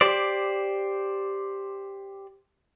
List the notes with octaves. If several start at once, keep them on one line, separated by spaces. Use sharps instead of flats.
G4 C5 D5